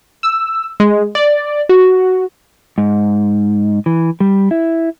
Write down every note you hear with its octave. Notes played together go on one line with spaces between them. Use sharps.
E6
G#3
D5
F#4
G#2
E3
G3
E4